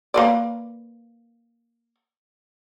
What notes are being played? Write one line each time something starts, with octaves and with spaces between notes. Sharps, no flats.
A#3 B4 D5